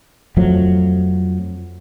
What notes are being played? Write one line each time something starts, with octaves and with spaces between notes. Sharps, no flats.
F2 F3 F#3 A3